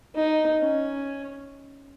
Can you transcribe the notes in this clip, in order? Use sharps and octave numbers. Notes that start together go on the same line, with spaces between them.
D#4
C#4